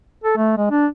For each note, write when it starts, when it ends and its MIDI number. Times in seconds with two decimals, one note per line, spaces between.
0.24 0.36 69
0.37 0.53 57
0.57 0.67 56
0.71 0.86 62